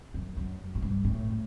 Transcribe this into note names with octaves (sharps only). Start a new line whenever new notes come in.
F#2
F#2
G#2
G2
A2